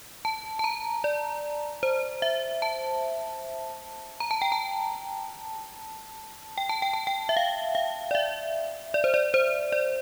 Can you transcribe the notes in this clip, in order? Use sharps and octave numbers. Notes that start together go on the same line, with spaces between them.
A5
A5
A#5
D5
C5
E5
A5
A#5
A5
G5
A5
G5
A5
G5
A5
G5
E5
F5
F5
D5
E5
D5
C5
D5
C5
D5